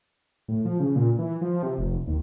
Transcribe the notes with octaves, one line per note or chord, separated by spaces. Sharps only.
A2
F3
C#3
A#2
E3
F3
C3
F1
D#2